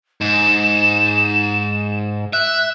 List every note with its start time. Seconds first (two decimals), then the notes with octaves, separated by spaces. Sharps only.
0.21 G#2 E7
2.33 E5 F#6